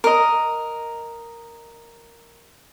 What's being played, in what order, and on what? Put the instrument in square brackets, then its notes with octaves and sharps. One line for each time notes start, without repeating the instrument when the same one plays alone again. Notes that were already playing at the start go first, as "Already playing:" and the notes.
[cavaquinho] A#4 D#5